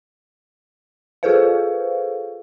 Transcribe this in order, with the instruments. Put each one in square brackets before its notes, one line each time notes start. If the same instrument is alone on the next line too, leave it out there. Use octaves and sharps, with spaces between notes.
[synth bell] F4 G#4 A4 B4 C5 F5